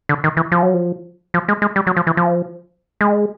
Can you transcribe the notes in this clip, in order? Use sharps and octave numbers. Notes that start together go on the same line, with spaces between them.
D3
D#3
E3
F3
F#3
F3
F3
G#3
G#3
G3
F#3
F3
E3
F3
G#3